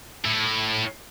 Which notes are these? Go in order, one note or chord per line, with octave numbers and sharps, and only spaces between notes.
A2 E4